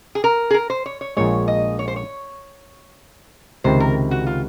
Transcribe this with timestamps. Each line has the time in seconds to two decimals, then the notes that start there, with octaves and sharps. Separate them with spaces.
0.15 G#4
0.24 A#4
0.51 G#4
0.54 A#4
0.70 C5
0.86 C#5
1.01 C#5
1.17 A#1 A#2 G#3 C#5
1.48 D#5
1.79 C#5
1.88 C5
1.96 C#5
3.64 C#2 C3 D#3 C5
3.80 A#4
4.11 F#4
4.27 F4